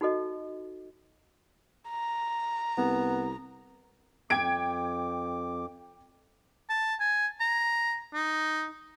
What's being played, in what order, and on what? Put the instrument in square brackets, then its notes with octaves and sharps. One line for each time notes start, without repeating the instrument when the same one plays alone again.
[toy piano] D#4 F#4 A4 D#5
[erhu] A#5
[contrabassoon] C2 [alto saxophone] B3
[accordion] F2 D6 [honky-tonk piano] G5 G#6 D7
[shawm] A5
G#5
A#5
D#4